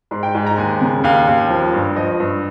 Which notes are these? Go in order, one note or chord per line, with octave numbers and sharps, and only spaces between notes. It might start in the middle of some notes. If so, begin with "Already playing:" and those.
G#2 C6
G5
G#2 G#5
A#5
D#2 G#5
C#3
D#2 F5
D#2
F3
G2
F3 D#5
G2